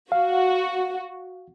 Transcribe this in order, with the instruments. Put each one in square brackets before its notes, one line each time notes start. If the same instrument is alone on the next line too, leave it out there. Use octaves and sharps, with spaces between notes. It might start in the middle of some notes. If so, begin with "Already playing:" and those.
[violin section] F#4 [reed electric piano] F5